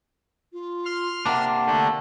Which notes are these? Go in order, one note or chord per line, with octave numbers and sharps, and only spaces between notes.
F4
C6 F6
C3 A#3 D4 F#5
D3 A3